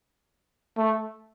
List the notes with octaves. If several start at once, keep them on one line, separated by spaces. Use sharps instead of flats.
A3